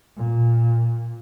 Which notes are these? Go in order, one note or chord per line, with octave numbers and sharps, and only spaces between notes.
A#2